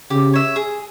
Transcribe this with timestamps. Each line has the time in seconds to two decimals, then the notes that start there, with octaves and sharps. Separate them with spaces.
0.10 C#3 G4
0.33 C#5 E5
0.56 G#4